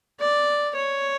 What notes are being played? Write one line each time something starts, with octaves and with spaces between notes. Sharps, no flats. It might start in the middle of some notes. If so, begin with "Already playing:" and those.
D5
C#5